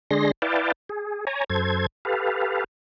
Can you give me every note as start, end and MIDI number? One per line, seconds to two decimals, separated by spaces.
0.11 0.31 50
0.11 0.31 56
0.11 0.31 62
0.11 0.31 68
0.11 0.31 84
0.11 0.31 94
0.42 0.72 64
0.42 0.72 71
0.42 0.72 74
0.42 0.72 77
0.42 0.72 79
0.42 0.72 81
0.89 1.25 68
1.27 1.44 73
1.27 1.44 80
1.27 1.44 82
1.50 1.87 42
1.50 1.87 69
1.50 1.87 72
1.50 1.87 92
2.05 2.64 67
2.05 2.64 69
2.05 2.64 71
2.05 2.64 77